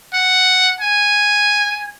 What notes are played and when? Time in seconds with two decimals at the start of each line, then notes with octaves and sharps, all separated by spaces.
0.14 F#5
0.81 G#5